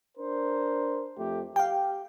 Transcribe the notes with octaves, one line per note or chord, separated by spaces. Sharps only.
D4 A#4 C5
F2 A3 G4
G4 F5 G5